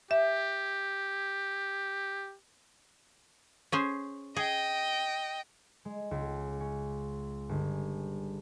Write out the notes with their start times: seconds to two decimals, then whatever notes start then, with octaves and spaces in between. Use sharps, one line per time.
0.11 G4 E5
3.72 C#4 G#4 C5
4.36 G#4 D#5 G5
5.85 G#3
6.11 C#2
6.60 C#4
7.49 G1